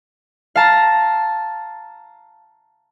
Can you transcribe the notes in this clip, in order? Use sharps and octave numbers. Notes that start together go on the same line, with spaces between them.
F5 A5 A#5